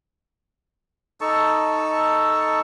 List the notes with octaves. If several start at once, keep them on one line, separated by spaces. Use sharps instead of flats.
D#4 A4 A5 C#6